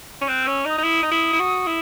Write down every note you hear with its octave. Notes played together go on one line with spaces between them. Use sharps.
C#4
C4 F#6
C#4 E6
D#4
D#6
D#4
E4
D#4
E4
E4
F#4
E4